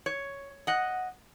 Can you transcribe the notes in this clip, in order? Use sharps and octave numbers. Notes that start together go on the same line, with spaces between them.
C#5
D#5 F#5